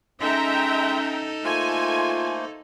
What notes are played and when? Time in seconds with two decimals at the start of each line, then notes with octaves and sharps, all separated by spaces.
0.20 G#3 C#4 D#4 A4 E5 G5 A#5
1.44 A3 A#3 F4 C5 G#5